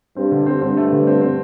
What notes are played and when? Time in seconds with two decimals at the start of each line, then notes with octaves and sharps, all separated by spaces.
0.17 G2 C4
0.31 D3
0.46 C4
0.61 G2 C4
0.77 A3
0.92 D3
1.07 C4
1.21 C4